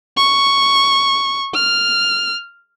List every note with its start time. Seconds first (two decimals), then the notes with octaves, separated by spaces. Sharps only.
0.17 C#6
1.54 F6